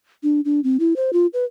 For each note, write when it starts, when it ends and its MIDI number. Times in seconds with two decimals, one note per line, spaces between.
0.23 0.41 62
0.45 0.60 62
0.64 0.77 60
0.80 0.96 64
0.96 1.11 72
1.13 1.26 65
1.33 1.44 71